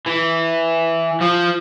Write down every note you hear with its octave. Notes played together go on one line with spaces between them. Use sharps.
E3
F3